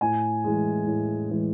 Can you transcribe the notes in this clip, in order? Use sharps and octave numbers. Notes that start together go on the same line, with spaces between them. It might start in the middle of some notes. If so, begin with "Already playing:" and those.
A2 G#5
E3 G#3
A2
E3 G#3